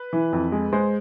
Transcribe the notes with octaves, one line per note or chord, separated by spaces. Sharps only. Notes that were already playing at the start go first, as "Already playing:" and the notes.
Already playing: B4
E3
F2
G#3
G#3 C5